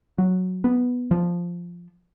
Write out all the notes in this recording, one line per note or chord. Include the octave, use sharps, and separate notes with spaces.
F#3
B3
F3